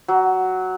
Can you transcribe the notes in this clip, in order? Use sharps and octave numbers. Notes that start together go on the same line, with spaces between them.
F#3